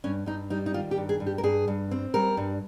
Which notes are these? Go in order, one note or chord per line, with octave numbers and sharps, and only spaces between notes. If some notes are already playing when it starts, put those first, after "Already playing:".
G2 C#4
G2 D#4
G3 D#4
D#4
D#3 F4
G4
G2
G#4
G2
G4
A#4
G2 G#4
G2
C4
G3 A#4
G2